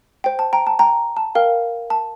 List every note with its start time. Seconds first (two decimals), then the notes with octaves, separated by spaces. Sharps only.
0.24 C5 G5
0.39 A5
0.53 G5 A#5
0.67 A5
0.79 G5 A#5
1.17 A5
1.35 A#4 F5 G5
1.90 A5